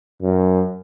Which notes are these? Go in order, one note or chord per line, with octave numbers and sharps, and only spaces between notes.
F#2